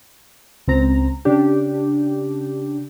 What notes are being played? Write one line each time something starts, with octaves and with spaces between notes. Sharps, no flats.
C#2 C4 A#5
C#3 D4 G4